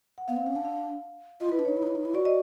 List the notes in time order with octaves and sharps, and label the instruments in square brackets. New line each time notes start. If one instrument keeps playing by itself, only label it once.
[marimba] F#5
[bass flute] B3 [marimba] F5
[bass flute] C4
[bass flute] C#4 [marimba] F5
[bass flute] D4
[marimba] F5
[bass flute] F4 [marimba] D#5
[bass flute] E4 [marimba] B4
[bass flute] D4
[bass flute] D#4 [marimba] C#5
[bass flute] E4
D#4
E4
D#4
E4
[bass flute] F#4 [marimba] D5
[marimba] D#5